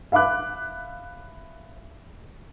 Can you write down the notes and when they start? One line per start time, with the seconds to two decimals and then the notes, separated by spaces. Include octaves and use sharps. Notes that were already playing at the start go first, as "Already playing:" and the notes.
0.12 E5 F5 B5 D6 F#6